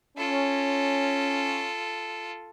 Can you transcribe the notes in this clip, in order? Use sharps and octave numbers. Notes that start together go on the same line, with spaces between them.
C#4 F4 A4